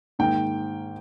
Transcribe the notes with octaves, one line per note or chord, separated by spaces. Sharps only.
G#2 D#3 A#3 G5